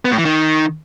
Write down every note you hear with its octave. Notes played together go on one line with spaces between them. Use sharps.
B3
A2
E3
D#3